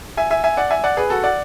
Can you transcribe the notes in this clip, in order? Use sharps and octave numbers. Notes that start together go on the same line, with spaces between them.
E5 G#5
E5 G#5
E5 G#5
D5 F#5
E5 G#5
D5 F#5
G#4 B4
F#4 A4
D5 F#5